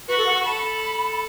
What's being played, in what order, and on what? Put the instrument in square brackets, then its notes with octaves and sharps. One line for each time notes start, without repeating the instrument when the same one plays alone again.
[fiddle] F#4 [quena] B4
[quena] A4
F#5
C#6
[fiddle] A4 [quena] B5